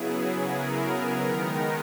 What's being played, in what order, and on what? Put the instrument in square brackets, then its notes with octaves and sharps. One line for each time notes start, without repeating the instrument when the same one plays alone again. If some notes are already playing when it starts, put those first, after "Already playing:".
Already playing: [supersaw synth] C#3 F#3 B3 E4 G#4
A#4
D#3 G#3 B3 D#4